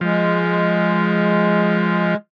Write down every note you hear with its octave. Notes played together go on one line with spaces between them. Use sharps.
F3 G#3